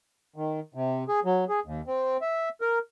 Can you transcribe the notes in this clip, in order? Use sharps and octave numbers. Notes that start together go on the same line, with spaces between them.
D#3
C3
G#4
F#3
G#4
D#2
C4
E5
A#4